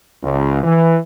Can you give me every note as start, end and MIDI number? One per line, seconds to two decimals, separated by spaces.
0.23 0.63 37
0.64 0.97 52